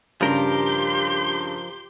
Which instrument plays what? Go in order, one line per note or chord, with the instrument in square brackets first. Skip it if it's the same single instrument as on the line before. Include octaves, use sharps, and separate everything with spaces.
[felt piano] G2 C#3 [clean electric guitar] F3 A#4 [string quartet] G4 C6 G6